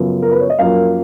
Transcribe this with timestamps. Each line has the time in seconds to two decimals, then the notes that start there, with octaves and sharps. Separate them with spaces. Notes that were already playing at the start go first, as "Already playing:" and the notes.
Already playing: F#2 C#3 F3 B3
0.22 A#4
0.31 B4
0.40 C#5
0.50 D#5
0.59 F#2 F3 A#3 F5